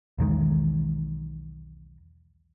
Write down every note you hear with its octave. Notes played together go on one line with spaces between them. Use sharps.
B1 E2 D#3 G#3